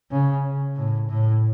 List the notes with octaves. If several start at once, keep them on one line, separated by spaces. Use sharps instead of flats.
C#3
A2
A2